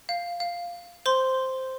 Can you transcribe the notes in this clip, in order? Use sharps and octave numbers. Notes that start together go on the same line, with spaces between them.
F5
F5
C5 C6